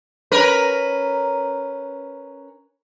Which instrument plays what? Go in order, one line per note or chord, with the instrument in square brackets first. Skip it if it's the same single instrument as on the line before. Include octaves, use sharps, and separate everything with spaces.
[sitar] C#4 A#4 B4